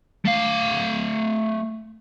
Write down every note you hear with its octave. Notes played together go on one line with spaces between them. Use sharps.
A3 F5